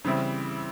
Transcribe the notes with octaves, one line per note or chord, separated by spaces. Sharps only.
C#3 E3 G3 C4 E4